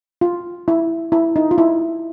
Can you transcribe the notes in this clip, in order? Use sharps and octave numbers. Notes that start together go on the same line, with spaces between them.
F4
E4
E4
D#4
F4
E4